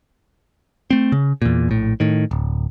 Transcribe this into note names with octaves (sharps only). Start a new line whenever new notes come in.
A3 C4
C#3
E2 A#2
A#1 A2
A2 D#3
D1